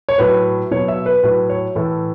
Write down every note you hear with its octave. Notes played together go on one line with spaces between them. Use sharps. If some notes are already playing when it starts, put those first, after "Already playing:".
C#5
A2 F#3 B4
B2 F#3 C#5
E5
B4
A2 F#3 B4
C#5
A2 E3 A4